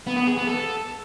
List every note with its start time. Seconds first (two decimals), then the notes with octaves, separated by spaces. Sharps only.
0.07 B3
0.17 B3
0.27 G#4
0.37 B3
0.47 A4